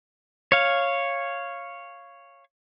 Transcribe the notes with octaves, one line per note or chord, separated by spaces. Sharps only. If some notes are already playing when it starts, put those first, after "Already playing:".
C#5 F5